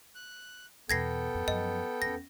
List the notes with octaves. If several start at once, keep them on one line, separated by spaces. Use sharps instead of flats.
F#6
E2 B2 B3 A4 G5 G#6 A#6 C7
F2
F#2 F3 D#5
E2 C#4 A#6